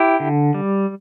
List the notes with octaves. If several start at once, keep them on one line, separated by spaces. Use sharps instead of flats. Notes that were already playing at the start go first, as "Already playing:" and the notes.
Already playing: E4 G4
D3
G3